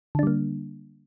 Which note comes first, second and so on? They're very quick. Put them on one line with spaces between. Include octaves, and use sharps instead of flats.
D3 D4 G3 A#3